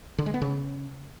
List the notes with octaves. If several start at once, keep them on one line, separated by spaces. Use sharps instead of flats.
D3
G#3
B3
C#3